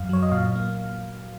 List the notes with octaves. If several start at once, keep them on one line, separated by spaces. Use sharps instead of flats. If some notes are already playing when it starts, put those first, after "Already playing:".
Already playing: F#2 F5
F#3 C#5
D#5
A#2 F5
A#3